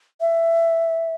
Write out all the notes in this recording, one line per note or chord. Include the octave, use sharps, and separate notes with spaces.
E5